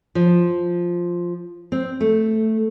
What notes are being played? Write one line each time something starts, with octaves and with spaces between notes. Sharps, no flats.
F3
C4
A3